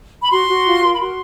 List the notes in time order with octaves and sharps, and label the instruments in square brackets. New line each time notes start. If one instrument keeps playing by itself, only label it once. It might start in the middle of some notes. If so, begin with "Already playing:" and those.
[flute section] B5
F#4 C6
F#4
F4
A#4
B5
F#4 C6